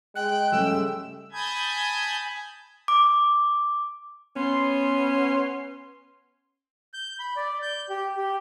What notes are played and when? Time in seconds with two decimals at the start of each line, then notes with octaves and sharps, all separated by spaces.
0.15 G#3 G5 F#6
0.52 C#3 G3 A3 E6
1.32 G#5 A5 B5 D#6 G6 G#6
2.88 D6
4.36 B3 C#4 C6
6.94 G6
7.20 B5
7.36 D5
7.62 G6
7.89 G4
8.17 G4